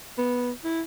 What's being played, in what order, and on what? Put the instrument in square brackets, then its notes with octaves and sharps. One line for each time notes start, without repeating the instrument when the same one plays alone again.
[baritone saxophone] B3
E4